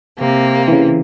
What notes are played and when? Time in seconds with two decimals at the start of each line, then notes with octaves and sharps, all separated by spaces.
0.18 C3 A#3
0.68 C#3 E3